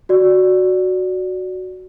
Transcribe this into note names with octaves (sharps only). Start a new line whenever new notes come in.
F#4 D5